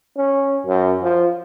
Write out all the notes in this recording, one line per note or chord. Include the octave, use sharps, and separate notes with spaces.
C#4
F#2
F3